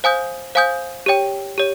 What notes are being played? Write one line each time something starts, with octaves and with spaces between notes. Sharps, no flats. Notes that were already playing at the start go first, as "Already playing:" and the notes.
C5 F5 G#5 D#6 G6
C5 F5 G#5 D#6 G6
G4 C#5 G5
G4 C#5